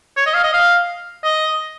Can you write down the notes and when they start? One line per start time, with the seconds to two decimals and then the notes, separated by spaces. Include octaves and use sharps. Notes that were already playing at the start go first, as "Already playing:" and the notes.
0.17 C#5
0.26 D#5
0.34 F5
0.43 D#5
0.53 F5
1.24 D#5